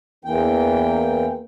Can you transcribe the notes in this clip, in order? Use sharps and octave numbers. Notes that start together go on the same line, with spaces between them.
E2 E3 A#3 D4 B4 G5